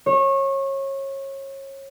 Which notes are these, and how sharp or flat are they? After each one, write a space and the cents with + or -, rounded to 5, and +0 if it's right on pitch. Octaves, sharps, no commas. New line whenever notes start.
C#5 -25